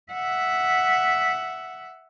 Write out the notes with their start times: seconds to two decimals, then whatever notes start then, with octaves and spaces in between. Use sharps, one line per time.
0.12 E5 F#5